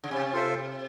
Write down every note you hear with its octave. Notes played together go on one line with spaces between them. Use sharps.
C#3
C3 C#4
F4 A4 C5 E5